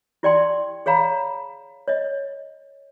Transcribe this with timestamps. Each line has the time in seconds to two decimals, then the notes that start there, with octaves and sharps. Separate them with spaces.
0.23 E4 G4 D5 G5 A5 C6
0.86 G#4 C#5 F5 A#5 B5
1.88 C#5 D#5